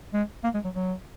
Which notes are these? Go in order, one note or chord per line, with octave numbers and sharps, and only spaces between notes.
G#3
A#3
G#3
F#3
F#3